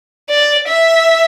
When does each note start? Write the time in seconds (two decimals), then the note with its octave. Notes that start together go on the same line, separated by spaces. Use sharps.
0.30 D5
0.68 E5